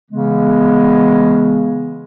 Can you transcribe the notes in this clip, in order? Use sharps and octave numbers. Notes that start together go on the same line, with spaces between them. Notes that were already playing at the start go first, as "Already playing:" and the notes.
C#3 E3 G#3 B3